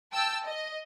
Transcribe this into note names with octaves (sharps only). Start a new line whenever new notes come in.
G5 A5 E6
D#5